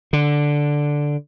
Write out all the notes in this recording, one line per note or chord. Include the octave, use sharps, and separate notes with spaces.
D3